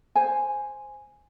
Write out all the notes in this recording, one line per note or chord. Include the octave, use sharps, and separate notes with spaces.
C5 G#5